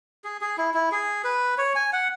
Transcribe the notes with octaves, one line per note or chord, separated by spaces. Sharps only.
G#4
G#4
E4
E4
G#4
B4
C#5
G#5
F#5